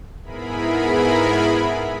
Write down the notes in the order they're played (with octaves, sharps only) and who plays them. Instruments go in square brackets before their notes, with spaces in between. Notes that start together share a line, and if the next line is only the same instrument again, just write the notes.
[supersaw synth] G#2 B3 E4 G#4 A#4 B5